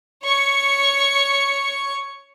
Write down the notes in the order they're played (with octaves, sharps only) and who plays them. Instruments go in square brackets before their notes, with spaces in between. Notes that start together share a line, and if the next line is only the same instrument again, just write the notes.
[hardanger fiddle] C#5 C#6